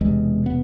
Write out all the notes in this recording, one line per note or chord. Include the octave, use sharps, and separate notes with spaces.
E1 E2 C3 G#3
B3